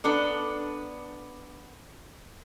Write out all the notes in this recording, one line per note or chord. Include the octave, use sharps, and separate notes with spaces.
B3 D4 A4 D5